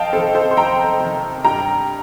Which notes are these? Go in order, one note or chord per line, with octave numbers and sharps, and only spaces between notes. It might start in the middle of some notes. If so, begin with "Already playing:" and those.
Already playing: F2 D#5 F5 G5 A5
C3 D#3 A4 C5
A4 C5
C6
F2 G5 A#5
C3 D#3
G2 G5 A#5